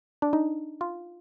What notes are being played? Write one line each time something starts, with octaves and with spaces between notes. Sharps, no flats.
D4
D#4
F4